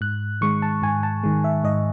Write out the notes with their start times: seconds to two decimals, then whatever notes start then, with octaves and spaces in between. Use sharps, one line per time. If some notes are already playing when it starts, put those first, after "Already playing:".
0.01 G#2 F#6
0.41 D#3 G#3 C#6
0.62 A5
0.82 G#2 G#5
1.03 A5
1.24 D#3 G#3
1.44 E5
1.64 G#2 D#5